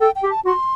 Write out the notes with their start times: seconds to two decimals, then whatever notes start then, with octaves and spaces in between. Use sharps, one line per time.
0.01 A4 G5
0.16 G5
0.23 G4
0.30 A5
0.45 F#4 C6